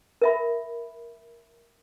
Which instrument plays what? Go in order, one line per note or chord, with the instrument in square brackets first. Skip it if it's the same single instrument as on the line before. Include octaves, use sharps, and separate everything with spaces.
[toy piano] A#4 E5 B5